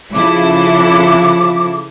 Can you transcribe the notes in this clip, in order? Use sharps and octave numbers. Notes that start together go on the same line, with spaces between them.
C#3 F3 E4 A4 D6